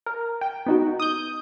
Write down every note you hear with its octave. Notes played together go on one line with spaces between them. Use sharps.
A#4
G5
B3 D#4 F#4
D#6 G6